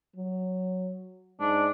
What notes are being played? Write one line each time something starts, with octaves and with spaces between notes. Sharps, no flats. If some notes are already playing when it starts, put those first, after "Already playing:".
F#3
G#2 D4